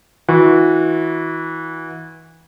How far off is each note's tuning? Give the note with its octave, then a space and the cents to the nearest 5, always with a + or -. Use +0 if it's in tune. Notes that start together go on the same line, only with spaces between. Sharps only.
E3 -25 F#4 -30